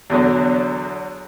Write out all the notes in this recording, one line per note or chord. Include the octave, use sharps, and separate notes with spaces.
E2 B2 D3 F#3